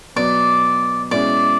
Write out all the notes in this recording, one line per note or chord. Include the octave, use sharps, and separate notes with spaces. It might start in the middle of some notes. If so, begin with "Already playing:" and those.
B2 F#3 B3 D5
B2 G#3 C#4 E4 D5